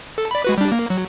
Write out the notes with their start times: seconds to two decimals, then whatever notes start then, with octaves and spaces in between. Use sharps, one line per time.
0.18 A4
0.31 D5 B5
0.44 G#3 F#4 B4
0.58 G3 D4
0.72 A#3
0.90 F#3